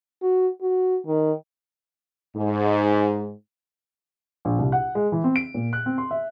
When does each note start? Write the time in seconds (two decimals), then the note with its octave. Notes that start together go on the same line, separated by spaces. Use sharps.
0.22 F#4
0.62 F#4
1.07 D#3
2.36 G#2
4.45 A#1
4.59 C2
4.72 F#5
4.95 G#3
5.12 E3
5.24 C4
5.36 D7
5.54 A#2
5.73 F#6
5.86 C4
5.98 C6
6.11 E5